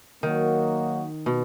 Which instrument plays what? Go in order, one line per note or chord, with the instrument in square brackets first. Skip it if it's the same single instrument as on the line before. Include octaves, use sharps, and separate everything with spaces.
[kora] D#3 [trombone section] F#3 A#3 D#4 F#4
[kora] B2